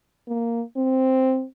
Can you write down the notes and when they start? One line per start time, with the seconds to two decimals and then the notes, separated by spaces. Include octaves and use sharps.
0.28 A#3
0.77 C4